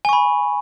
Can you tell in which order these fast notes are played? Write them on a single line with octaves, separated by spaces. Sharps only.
G#5 C#6 B5